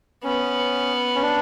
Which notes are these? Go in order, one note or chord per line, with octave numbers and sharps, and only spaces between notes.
B3 C#4
C#4
D4